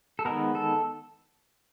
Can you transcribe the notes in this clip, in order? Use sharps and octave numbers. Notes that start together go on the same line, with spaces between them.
A4
D#3 G#3 B3 A#4
A4